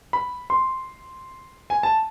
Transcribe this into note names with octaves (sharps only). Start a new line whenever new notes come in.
B5
C6
G#5
A5